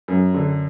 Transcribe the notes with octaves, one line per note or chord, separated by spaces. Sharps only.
F#2
D3